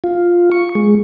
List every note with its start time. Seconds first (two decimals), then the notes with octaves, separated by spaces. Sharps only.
0.04 F4
0.52 C#6
0.75 G#3